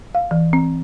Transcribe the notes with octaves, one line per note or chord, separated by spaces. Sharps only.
F5
E3
C4